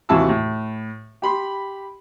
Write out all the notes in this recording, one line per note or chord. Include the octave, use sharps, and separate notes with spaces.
D#2 C3 E3 F#4 A5 E6
A2
G4 B5 C6